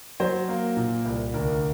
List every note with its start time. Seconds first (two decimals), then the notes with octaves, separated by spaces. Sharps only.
0.20 F#3 C5
0.48 A#3
0.77 A#2
1.05 C2
1.34 D2 A#4